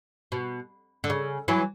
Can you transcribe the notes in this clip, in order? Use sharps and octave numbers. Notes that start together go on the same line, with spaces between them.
B2
D3
C#3
E3 F#3